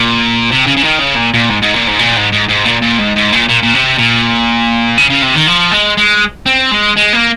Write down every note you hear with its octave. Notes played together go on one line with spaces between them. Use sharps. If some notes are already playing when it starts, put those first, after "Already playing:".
Already playing: A#2
C3
C#3
C#3
D#3
C#3
A#2
A#2
G#2
G#2
A#2
G#2
A#2
G#2
G#2
G#2
A#2
A#2
G#2
G#2
A#2
A#2
A#2
C3
A#2
C#3
C#3
C3
D#3
F3
G#3
G#3
C4
G#3
G#3
A#3